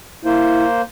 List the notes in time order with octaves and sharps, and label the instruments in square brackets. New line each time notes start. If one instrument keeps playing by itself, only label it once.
[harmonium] A#3 C5 [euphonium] E4